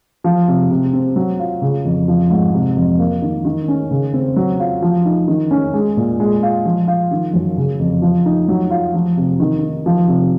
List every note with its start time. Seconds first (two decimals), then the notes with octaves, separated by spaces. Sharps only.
0.24 F3
0.48 C3
0.71 C3
0.93 C4
1.16 F#3
1.39 F4
1.62 C#3
1.85 F2
2.08 F3
2.30 G#2
2.54 C3
2.77 F2
2.99 A#3
3.22 D#3
3.45 D#3
3.68 C#4
3.91 C#3
4.14 C4
4.36 F#3
4.60 F4
4.82 F3
5.05 D#4
5.28 D#3
5.51 C#4
5.74 G#3
5.97 A#2
6.20 G#3
6.43 F4
6.65 F3
6.88 F4
7.11 D#3
7.34 F#2
7.57 C#3
7.79 F2
8.02 F3
8.25 D#4
8.48 F#3
8.71 F4
8.94 F3
9.17 C3
9.40 D#3
9.63 D#4
9.86 F3
10.08 C3